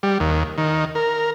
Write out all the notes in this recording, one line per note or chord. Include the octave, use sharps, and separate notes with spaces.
G3
D#2
D#3
A#4